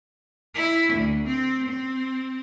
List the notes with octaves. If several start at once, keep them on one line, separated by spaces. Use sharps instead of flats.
E4
D2
C4
C4